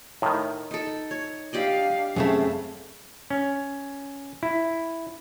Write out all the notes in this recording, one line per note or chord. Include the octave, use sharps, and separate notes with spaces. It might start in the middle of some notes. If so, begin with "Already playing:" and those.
A2 D#3
D#4 A4
C#5
D4 G4 D5 D#5 F5
F#2 C#3 A3 C4
C#4
E4